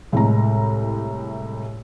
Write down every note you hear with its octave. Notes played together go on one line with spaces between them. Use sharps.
C2 A2 C3 G#3 A3 A#5